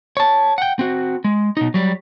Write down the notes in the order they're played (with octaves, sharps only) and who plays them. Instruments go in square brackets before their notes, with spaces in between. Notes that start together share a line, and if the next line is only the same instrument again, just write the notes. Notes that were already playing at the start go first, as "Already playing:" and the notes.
[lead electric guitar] C#5 A5
F#5 G5
C4 F#4
G#3
B2 D#4
F#3 G3